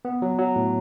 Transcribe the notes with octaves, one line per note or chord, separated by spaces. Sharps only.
B3
F#3
F#3
A2